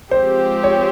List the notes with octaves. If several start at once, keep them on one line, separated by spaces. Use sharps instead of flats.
F3 G#3 C4 G4 C5
C#5